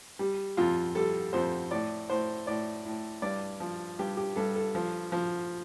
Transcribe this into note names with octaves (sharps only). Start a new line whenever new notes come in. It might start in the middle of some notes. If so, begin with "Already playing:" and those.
G3
F2 F4
G3 A4
F2 C5
A2 D5
A2 C5
A2 D5
A2
G2 D5
F3
G2 G4
G4
G2 A4
A4
F3
F3